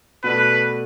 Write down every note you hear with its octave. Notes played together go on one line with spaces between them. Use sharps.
B2 A3 F#4 A4 B4 D5